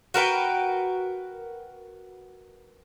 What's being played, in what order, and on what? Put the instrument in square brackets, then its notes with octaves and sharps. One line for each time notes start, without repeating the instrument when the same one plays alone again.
[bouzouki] F#4 A#4 B4 G5